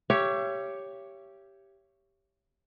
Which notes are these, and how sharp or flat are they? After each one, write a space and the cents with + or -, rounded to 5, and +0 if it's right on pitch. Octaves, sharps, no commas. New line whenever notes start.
G4 +0 C#5 +5 E5 +40